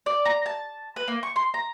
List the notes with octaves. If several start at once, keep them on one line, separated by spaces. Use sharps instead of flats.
D5
A#5
A5
B4
A#3
C#6
C6
A#5